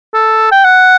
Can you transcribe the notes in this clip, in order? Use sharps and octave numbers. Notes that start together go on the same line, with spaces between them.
A4
G5
F#5